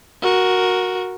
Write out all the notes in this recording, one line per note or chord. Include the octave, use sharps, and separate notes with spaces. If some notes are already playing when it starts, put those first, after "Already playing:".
F#4 A#4